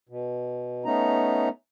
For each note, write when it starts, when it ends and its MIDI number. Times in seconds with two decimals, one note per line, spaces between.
0.09 0.85 47
0.85 1.49 57
0.85 1.49 59
0.85 1.49 61
0.85 1.49 63
0.85 1.49 82